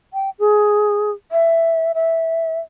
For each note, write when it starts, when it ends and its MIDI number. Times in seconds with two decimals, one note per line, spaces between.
0.14 0.30 79
0.39 1.11 68
1.32 1.92 76
1.95 2.59 76